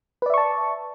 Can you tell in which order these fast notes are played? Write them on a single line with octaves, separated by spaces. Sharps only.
B4 D5 E5 C#6 A5